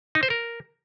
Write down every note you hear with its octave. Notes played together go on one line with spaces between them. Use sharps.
D#4
C5
A#4